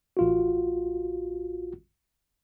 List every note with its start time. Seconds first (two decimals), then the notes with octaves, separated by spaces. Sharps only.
0.17 A1 F4 F#4